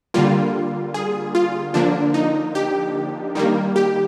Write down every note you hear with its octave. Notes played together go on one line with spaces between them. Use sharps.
D3 G3 A#3 F4
G#4
F4
D3 F3 A#3 D4
D#4
G4
D#3 G3 A#3
G4